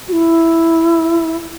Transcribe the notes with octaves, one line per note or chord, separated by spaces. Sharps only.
F#4
E4